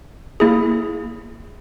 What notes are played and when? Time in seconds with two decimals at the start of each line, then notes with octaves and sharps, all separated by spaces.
0.40 A#3 E4 G#4